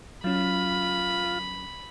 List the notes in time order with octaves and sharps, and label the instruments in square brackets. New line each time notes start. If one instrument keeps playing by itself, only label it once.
[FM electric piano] F#3 C#4 [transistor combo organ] F4 [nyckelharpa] B5